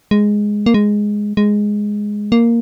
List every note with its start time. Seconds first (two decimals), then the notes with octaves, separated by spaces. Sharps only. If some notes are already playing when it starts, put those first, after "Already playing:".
0.11 G#3
0.66 A#3
0.74 G#3
1.37 G#3
2.32 A#3